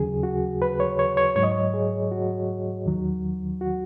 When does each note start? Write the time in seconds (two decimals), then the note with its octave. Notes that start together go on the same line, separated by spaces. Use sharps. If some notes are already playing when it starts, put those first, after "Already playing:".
Already playing: D#2 C#3 F#3 G#4
0.23 F#4
0.62 B4
0.80 C#5
0.99 C#5
1.17 C#5
1.36 G#2 F#3 C#5
1.43 D#5
1.52 C#5
1.74 G#4
2.11 F#4
2.86 D#2 D#3 F#3
3.61 F#4